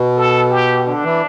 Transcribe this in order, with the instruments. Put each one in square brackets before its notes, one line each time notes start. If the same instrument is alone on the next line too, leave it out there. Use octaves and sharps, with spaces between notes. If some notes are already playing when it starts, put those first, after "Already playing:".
Already playing: [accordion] B2
[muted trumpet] A4
G4
[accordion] D3 [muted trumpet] D4
[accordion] E3